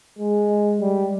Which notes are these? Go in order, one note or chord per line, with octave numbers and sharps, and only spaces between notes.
G#3
G3